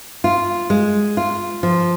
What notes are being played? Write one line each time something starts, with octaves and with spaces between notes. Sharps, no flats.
F4
G#3
F4
F3